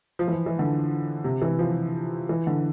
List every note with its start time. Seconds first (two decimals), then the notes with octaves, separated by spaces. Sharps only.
0.19 F3
0.28 E3
0.33 F3
0.46 E3
0.59 D3
1.24 C3
1.42 E3
1.59 F3
2.29 E3
2.47 D3